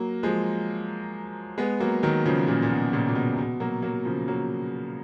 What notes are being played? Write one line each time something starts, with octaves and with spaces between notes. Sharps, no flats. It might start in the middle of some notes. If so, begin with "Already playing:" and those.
Already playing: F#3 A#3
F3 G#3
G#3 B3
F#3 A#3
D#3 F#3
C#3 F3
A#2 C#3
A#2
B2
A#2 C#3
A#2
B2
B2
F#3 A#3
F#3 A#3
C#3 F3
F#3 A#3